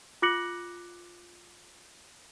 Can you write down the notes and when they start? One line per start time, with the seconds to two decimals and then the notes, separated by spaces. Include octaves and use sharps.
0.22 F4 D6 F#6 A#6 C#7 F#7